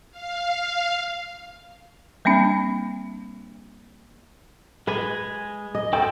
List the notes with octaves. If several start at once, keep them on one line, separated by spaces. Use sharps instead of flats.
F5
G3 A#3 C4 D4
G#3 G#4 B4 G#5
D#5
G#3 F#4 A4 G5